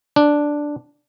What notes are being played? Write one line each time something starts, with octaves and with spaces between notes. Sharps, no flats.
D4